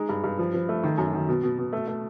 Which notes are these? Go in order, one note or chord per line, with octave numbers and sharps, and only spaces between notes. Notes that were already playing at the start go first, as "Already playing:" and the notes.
Already playing: G#3 D#4
G2
G2
F3
F3
A3
D#3
F#2
D#3
B2
B2
B2
A3
A3